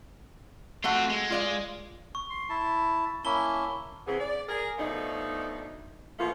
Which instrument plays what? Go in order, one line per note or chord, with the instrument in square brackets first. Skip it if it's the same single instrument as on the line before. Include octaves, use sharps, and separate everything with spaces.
[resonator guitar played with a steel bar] A3 F#4 F#5 [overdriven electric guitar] C4 F4
[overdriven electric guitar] G#3
[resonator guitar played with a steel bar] F4 D5 F5
[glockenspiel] C#6
[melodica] C6
E4 A5
[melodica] A#3 C#4 E4 [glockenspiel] A5 C#6 G7
[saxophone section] C3 E3 B3 C4 G#4
D5
G#4 A#4
B2 F3 A3 D4 D#4
B2 E3 F3 A3 A#3 F4